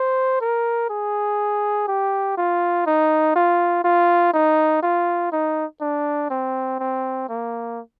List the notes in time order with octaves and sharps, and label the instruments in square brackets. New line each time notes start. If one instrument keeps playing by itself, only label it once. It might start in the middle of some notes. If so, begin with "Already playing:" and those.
Already playing: [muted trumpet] C5
A#4
G#4
G4
F4
D#4
F4
F4
D#4
F4
D#4
D4
C4
C4
A#3